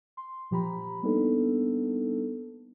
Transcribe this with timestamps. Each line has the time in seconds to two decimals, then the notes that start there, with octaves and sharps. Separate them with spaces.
0.17 C6
0.51 A#2 F3 G4 A#5 B5
1.03 G3 A#3 B3 D4 D#4 A4